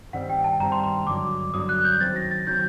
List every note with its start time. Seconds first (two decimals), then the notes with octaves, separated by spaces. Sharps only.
0.13 G2 D#3 G3 C4 F#5
0.29 G5
0.44 A5
0.60 G2 D#3 G3 C4 A#5
0.72 C6
0.84 C6
1.07 G2 D3 F#3 D6
1.54 G2 D3 F#3 D#6
1.69 F#6
1.84 G6
2.01 D#3 F#3 C4 A6
2.16 A#6
2.31 A6
2.47 D#3 F#3 C4 G6